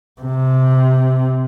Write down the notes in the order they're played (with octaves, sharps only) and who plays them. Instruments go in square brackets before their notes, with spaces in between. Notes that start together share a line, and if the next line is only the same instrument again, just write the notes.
[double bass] C3